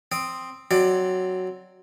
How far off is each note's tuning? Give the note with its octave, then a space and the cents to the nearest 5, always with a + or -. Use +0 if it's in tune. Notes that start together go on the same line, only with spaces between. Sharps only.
C4 +0 D#6 +0
F#3 +0 C4 +0 D5 +25